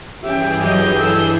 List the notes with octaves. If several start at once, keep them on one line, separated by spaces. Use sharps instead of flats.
G2 E3 C#4 G4 G#4 E5 G5
F#3 G4 D#5 G6
E4 A4 E6